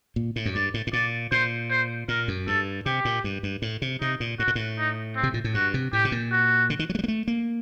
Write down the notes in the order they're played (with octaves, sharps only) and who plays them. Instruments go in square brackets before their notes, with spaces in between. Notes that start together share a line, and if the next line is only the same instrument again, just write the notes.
[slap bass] A#2
A2
F#2
[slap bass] G2 [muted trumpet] D5
[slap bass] A2
A2
[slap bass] A#2 [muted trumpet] D5
[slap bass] A#2 [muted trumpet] C5
[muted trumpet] C5
[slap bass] A#2 [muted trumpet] A#4
[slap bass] F#2
[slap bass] G2 [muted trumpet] A4
[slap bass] C3 [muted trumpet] G4
[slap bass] A#2
G2
G2
A2
C3
[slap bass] C3 [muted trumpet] D#4
[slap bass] A#2
[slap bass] A2 [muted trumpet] F#4
[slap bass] A#2
A2
[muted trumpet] D#4
C4
[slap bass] C3
A#2
A2
[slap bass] G2 [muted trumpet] F#4
[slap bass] C3
[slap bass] A2 [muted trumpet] G4
[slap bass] C3
A#2
[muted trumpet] F#4
[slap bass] D3
D#3
F#3
A3
G3
A#3
A3
A#3